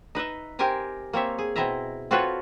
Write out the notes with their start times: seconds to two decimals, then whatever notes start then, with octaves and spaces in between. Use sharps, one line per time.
0.15 D#4 B4 D#5 E5
0.59 C4 G4 A#4 C5 G#5 A#5
1.13 A#3 C4 C#5 E5
1.38 G#4
1.56 B2 C4 E4 D#5 E5 A#5
2.11 C4 F4 F#4 A4 B4 C#5